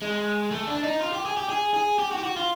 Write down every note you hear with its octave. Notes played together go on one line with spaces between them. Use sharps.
G#3
A3
D4
D#4
F4
G4
G#4
G4
G#4
G#4
G4
F#4
G4
F#4
F4